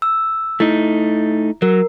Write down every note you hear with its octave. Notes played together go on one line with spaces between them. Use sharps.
E6
A3 D#4 E4
F#3 A#4